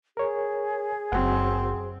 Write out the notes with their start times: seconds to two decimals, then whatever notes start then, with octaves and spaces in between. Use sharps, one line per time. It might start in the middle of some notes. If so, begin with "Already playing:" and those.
0.17 G#4 A#4 C#5
1.12 F#1 F#2 C4 F#4 F#5